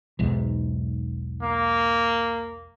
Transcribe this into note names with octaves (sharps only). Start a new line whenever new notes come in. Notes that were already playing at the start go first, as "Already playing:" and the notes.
B1 E2 G#2
A#3